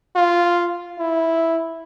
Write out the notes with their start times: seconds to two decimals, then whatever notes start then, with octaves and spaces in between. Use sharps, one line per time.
0.16 F4
0.99 E4